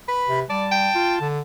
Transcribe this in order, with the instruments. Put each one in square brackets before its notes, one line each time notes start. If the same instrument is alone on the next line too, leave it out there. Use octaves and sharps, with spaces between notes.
[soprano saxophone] B4 [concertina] B5
[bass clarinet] C3
[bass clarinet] G3 [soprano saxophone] D5 [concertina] A5
[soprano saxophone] G5
[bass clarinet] F4
D3